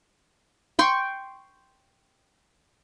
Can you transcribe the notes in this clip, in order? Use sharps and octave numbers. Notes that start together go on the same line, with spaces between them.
G5 C6 C#6